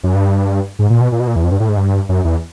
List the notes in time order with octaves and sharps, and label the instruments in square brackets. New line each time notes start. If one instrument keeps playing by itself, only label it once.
[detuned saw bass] F#2
G2
G#2
A#2
B2
A#2
B2
A#2
E2
F2
G2
A2
G#2
G2
F#2
E2